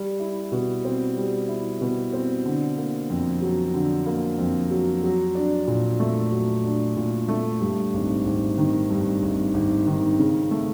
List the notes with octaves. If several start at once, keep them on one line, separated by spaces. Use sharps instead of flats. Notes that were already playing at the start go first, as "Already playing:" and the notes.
Already playing: G3
E4
B2
C4
G3
E4
B2
C4
D3
A#3
F2
F#3
D3
A#3
F2
F#3
F#3
D4
A#2
A3
F#3
D4
A#2
A3
G2
G#1
G#1
D#3
G2
G#1
G#1
D#3
C#3
A3